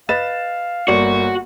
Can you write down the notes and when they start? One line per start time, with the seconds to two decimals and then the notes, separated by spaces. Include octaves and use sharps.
0.09 B4 D#5 F5 A6 E7
0.88 G1 A#3 F#4 C#5 D5 C#6